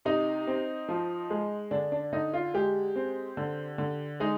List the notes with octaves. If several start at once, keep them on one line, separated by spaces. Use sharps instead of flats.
C3 D#4
C4
F3
G#3
D3 D4
D4
D3 D#4
F4
G#3 G4
C4
D3
D3
G#3 D#4